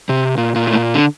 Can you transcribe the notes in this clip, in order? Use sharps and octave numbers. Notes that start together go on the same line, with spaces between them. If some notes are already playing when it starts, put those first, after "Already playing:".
C3
A#2
A#2
A2
A#2
D3